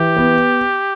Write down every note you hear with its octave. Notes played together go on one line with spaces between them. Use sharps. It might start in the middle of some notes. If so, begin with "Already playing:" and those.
Already playing: E3 G4
B3